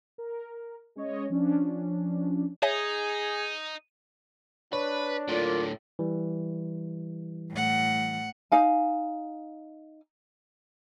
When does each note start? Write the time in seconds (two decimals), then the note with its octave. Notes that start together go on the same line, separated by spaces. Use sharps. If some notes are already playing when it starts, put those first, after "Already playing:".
0.18 A#4
0.96 G#3 C#4 C#5 D#5
1.30 F3 C#4 D4
2.63 D#4 G#4 C#5 E5 G#5
4.73 D4 B4 C#5
5.28 A2 D3 A#3 F4 D5
5.99 E3 G3
7.52 A2 F#5
8.52 D#4 F5 G#5